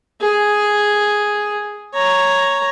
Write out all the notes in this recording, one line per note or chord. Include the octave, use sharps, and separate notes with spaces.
G#4
C#5 A#5